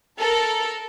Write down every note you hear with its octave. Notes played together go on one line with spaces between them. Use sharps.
A4 A#4